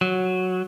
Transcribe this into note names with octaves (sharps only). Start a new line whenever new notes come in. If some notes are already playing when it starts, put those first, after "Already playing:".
F#3